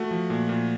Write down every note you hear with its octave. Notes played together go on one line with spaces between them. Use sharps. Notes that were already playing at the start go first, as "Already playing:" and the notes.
Already playing: A3 F#4
F3
A#2
A#2